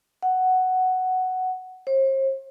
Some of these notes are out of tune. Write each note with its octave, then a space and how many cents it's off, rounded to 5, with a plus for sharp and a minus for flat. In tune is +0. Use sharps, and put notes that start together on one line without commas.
F#5 +5
C5 +40